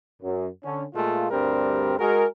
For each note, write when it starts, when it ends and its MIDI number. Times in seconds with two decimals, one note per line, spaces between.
0.22 0.48 42
0.64 0.83 50
0.64 0.83 61
0.94 1.29 46
0.94 1.29 56
0.94 1.29 57
0.94 1.29 65
1.31 1.94 38
1.31 1.94 43
1.31 1.94 55
1.31 1.94 60
1.31 1.94 67
1.31 1.94 70
1.99 2.25 56
1.99 2.25 66
1.99 2.25 68
1.99 2.25 70